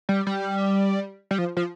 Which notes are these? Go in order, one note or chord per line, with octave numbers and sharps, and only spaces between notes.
G3
G3
G3
F3
F3